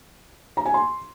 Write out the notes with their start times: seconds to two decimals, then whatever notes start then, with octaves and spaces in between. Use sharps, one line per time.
0.57 A#5
0.66 G#5
0.74 C6